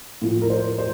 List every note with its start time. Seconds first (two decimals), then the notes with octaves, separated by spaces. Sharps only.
0.22 A2 F3
0.42 A#4
0.50 C5
0.78 C5